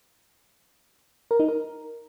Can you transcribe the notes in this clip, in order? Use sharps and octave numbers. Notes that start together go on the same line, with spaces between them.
A#4
D#4
A#4